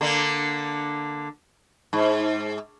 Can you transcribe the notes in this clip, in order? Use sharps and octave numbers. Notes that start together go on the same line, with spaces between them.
D3 A#3 D4
G#2